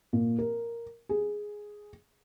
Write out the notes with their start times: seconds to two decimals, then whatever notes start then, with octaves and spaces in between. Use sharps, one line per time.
0.13 A#2
0.39 A#4
1.09 G#4